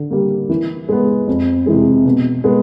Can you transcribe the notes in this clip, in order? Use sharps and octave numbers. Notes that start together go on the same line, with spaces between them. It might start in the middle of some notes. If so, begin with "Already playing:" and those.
Already playing: D3
G3 A#3
E3
G#3 B3
F2
C3 E3 G#3
B2
G#3 B3